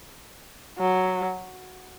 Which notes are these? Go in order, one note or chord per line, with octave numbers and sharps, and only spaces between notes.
F#3